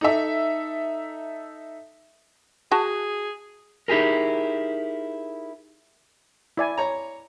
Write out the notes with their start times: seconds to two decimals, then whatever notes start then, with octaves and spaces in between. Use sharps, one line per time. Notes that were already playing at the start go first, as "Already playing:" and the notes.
0.01 D#4 A4 E5
2.72 F#4 G#4 A5
3.88 D#4 E4 G4 G#4 A#4
6.57 E4 D5 G#5
6.77 C#5 A#5